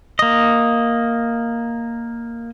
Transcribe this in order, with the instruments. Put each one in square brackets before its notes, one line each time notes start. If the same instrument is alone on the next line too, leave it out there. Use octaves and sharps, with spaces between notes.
[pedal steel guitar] A#3 D#5